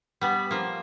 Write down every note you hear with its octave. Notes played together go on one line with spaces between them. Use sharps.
G3 B3
F3 A#3